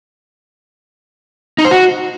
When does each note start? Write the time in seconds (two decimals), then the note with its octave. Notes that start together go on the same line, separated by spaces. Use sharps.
1.58 D#4
1.65 C5
1.71 F#4